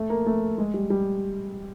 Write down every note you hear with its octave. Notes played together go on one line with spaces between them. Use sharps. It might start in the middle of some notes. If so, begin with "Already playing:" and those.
Already playing: A3
A#3
A3
G#3
G3
G3